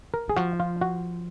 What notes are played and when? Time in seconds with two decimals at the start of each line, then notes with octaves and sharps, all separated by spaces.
0.14 A#4
0.28 D#3 G#4
0.36 F3 F#4
0.60 F4
0.81 F#4